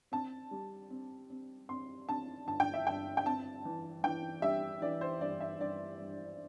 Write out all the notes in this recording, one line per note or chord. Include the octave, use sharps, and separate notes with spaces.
C4 A5
G3
C4
C4
C4 C6
C4 A5
G1 A5
G5
E5
G2 G5
G5
C4 A5
E3
E3 G5
G3 E5
E3 D5
C5
G2 D5
E5
G2 D5
G2